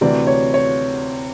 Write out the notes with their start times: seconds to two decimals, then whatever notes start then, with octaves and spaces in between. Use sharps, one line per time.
0.01 D2 C3 E3 D5
0.27 C#5
0.54 C#5